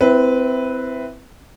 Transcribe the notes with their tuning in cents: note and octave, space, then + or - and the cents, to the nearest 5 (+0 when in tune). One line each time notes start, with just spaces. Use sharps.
C4 -20 E4 +0 B4 +0